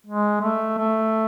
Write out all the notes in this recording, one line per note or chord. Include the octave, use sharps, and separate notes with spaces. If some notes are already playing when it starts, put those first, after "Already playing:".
G#3
A3
A3